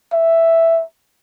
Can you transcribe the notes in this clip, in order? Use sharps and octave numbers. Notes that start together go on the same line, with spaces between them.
E5